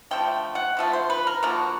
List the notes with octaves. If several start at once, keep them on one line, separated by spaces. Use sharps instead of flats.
D3 F3 A3 G5
F#5
D3 F3 A3
C5
B4
A#4
D3 F3 A#3 F#4